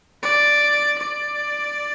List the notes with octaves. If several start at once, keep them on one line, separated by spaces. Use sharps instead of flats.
D5
D5